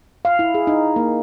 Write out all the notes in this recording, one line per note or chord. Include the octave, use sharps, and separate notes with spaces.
F5
E4
G#4
D#4
A#3